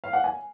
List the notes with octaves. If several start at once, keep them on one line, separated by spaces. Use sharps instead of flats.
F5
F#5
G#5